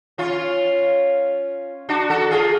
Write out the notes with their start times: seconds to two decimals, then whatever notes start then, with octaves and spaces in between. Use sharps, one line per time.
0.18 C#4 F4
1.89 D4 F#4
2.10 F#4 A4
2.31 F4 G#4